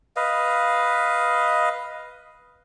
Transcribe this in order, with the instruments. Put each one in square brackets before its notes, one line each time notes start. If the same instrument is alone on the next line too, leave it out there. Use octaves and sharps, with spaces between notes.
[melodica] B4 D#5 F5